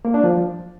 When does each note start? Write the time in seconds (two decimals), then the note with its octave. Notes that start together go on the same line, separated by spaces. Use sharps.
0.05 A#3
0.14 D4
0.24 F3